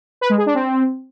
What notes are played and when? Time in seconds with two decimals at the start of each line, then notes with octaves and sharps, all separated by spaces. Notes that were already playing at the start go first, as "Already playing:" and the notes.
0.21 B4
0.30 G#3
0.38 G#4
0.46 D4
0.55 C4